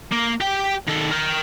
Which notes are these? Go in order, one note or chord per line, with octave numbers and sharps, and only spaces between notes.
A#3
G4 G5
D#3 A4
A#4 G5